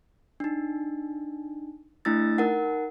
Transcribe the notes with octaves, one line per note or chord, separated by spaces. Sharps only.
D4 D#4
A3 D4 E4 E6 A6
D#4 A#4 F#5